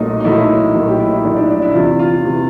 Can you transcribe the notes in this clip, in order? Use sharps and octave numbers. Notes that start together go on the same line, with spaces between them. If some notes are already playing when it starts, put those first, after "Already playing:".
Already playing: B1 A#2 F#3 A3 D#4
D#4
B1 A#2 F#3 A3 E4
B1 A#2 F#3 A3
G4
E4
D#4
B1 A#2 F#3 A3 D4
D4
D4
E4
E2 C3 E3 F4
F4
C3 E3